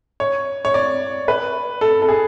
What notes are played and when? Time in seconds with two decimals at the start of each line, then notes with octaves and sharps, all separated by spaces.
0.20 C#5
0.65 C#5
0.74 D5
1.28 B4
1.81 A4
2.02 A4
2.09 G#4